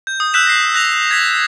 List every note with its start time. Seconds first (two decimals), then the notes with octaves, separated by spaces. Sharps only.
0.07 G6
0.20 D#6
0.34 E6 F#6 G6 B6 E7
0.47 A#6 C7
0.74 F#6 A#6 F7
1.11 G#6 A#6 B6